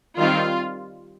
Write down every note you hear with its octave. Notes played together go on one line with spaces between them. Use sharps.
D#3 G3 C4 F4